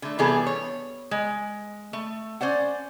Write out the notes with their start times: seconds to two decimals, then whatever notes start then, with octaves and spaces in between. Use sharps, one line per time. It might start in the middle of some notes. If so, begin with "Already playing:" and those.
0.02 D3 A3
0.18 C3 E3 G3 B3 G#4 A4
0.46 C#5
1.11 G#3
1.93 A3
2.41 C#4 C5 D5 F#5